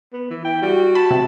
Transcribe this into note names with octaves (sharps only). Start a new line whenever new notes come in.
B3
E3
E4 G5
G3 F#4
A5 B5
C3